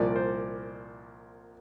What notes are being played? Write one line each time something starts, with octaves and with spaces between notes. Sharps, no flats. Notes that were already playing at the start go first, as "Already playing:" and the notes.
Already playing: C2 A#2 F3 D5
C5